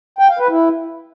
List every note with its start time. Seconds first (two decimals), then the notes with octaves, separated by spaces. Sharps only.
0.19 G5
0.29 F5
0.39 B4
0.49 E4